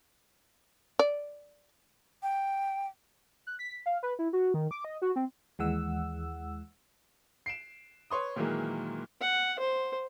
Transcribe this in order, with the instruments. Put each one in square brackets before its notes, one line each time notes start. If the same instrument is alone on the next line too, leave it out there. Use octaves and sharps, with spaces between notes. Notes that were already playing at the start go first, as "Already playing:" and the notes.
[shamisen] D5
[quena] G5
[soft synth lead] F#6
B6
F5
B4
E4
F#4
D#3
D6
D#5
F#4
C4
[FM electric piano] D#2 E3 G#3 F#5 E6
[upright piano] C7 D7 E7
B4 C#5 C6 D#6
A#2 D#3 E3 F#3 G#3 A#3
[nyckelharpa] F#5
C5